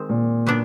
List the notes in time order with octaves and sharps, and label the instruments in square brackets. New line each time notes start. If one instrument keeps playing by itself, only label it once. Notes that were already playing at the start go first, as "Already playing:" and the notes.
Already playing: [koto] D#3 G#3 C4
[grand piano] A#2
[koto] F#3 B3 D4